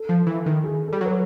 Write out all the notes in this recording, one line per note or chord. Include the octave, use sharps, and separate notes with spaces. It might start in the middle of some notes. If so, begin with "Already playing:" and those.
Already playing: A4
F3
E3
D#3
G#4
G3 A4
F#3 B4